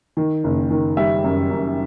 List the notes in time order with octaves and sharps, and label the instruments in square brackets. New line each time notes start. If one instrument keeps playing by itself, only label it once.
[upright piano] D#3
F#1
D#3
G3 E5
F#2
F#2